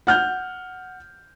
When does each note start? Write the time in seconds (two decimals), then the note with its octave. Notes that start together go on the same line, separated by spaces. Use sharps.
0.07 F#5 F6 G6